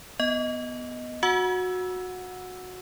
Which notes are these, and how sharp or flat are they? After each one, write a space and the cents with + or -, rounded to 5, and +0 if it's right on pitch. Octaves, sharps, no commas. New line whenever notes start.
B3 +0 D#5 +5
F#4 -15 F#5 -15 E6 +0